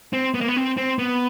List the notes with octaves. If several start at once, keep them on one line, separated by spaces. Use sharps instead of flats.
C4
B3
A#3
B3
C4
C4
B3